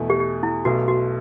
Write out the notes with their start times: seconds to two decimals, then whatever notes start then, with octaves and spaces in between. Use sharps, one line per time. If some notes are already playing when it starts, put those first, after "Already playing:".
Already playing: E2 B2 A3
0.10 G4
0.20 G4
0.43 E4
0.65 B1 B2 A3 F#4
0.88 F#4